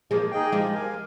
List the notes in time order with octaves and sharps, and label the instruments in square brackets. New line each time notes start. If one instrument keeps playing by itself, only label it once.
[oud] F3 G#3 [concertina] A#3
[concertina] D#4 G#4 D#5 G5
[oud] F3 G#3 [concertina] G4
[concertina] A#4 F5 G#5